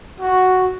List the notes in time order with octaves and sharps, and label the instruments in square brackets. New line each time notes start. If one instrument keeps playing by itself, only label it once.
[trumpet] F#4